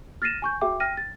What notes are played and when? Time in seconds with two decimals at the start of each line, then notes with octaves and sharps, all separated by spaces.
0.22 F6 A6 A#6 C7 D#7 E7
0.42 G#5 C#6 G6
0.61 F#4 G#4 E5 G5 D6
0.80 G5 F6 A#6 D#7
0.97 A6